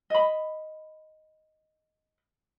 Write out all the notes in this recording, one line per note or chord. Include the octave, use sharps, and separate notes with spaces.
D#5 B5